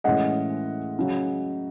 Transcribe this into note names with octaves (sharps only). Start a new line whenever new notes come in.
A2 E3 G#3 C#4 D#5 F#5
C#3 F#3